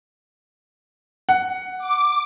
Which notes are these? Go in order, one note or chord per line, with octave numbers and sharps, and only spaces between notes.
F#5
D6